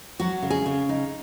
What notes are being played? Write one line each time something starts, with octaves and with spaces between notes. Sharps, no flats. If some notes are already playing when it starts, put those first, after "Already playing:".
F#3 F#4
C#3
G#4
C#3
D#4